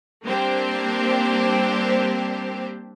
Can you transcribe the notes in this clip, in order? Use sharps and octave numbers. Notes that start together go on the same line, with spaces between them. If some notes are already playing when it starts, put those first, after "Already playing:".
G3 A#3 C4 D4 G4 C5